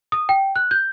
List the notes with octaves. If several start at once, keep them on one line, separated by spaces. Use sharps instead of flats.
D#6
G5
F#6
G6